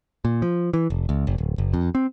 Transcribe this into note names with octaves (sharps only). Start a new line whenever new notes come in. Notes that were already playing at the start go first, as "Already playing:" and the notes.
A#2
F3
E3
F1
C#2
F#1
D1
F#1
F2
C4